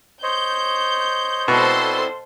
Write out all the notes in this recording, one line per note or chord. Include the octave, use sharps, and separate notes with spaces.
C5 C#5 D#5 G6
B2 C4 E4 A4 C5 D5 C6